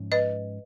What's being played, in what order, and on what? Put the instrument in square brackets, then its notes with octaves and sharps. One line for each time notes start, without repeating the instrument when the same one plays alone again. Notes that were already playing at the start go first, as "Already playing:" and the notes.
Already playing: [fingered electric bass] G#2 F3 G#3 C#4
[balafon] B4 D#5